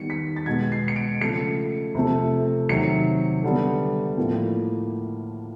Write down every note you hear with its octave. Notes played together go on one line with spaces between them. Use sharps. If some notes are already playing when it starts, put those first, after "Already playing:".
Already playing: D#3 G3 B3 C#7
B6
A6
B2 G#3 B3 G#6
C7
C#7
D7
C#3 F3 A3 C#7
C3 F3 A3
C3 D#3 F#3 C#7
D3 G3 B3
A2 F3 A#3